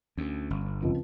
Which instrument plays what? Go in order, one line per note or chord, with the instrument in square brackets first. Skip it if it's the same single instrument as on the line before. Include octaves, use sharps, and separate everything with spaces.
[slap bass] D2 [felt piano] C#4
[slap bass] G1
[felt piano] C#2 F3 C4